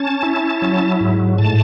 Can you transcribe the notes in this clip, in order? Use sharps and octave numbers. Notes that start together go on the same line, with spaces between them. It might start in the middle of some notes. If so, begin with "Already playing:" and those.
Already playing: C#4 A5
E4
F#3
G#2
A2 A5